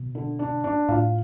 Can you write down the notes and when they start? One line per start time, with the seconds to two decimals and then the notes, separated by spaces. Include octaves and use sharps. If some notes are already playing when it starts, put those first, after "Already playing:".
Already playing: B2
0.15 D3
0.39 D4
0.64 D4
0.89 A2 F4